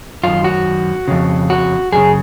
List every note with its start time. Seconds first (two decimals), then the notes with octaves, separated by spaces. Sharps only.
0.23 F#2 D#3 F4
0.44 F#4
1.08 F2 C#3
1.50 F#4
1.92 F#2 C#3 G#4